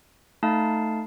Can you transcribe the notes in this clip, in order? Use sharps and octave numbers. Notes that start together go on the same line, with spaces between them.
A3 D#4 F5 A5